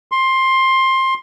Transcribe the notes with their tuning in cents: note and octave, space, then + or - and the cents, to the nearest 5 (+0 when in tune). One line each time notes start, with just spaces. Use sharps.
C6 +15